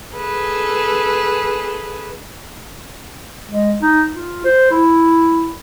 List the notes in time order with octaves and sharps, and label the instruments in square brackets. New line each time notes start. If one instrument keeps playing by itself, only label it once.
[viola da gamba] G#4 A4 B4
[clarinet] G#3
D#4
F4
C5
E4